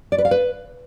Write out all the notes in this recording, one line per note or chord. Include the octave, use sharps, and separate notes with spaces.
D5
B4
F5
B4